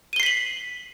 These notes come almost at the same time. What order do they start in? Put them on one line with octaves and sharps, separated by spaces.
D#7 G7 C7 B6 F#7